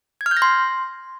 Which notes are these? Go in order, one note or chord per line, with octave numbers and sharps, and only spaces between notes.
G#6
F6
G6
A#6
C6